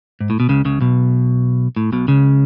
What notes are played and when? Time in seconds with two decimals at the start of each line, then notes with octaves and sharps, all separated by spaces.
0.20 G#2
0.30 A2
0.40 B2
0.49 C#2 C#3
0.65 C#2 C#3
0.81 B1 B2
1.76 A2
1.92 B1 B2
2.08 C#2 C#3